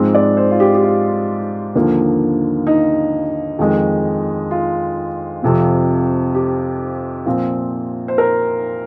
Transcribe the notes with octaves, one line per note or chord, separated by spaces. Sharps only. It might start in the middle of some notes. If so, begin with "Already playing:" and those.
Already playing: G#2 F3 G#3 C4
D5
C5
F4
G4
G4
F4
D#2 D3 F3 A#3
D#4
F2 D#3 G#3
F4
F2 C3 F3 C4
G4
A#2 F3 C4
C5
A#4